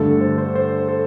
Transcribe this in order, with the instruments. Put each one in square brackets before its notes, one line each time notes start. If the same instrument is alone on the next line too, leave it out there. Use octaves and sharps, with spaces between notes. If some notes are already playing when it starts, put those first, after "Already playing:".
Already playing: [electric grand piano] G2 D3 A3 A4
C5
C5
C5
A4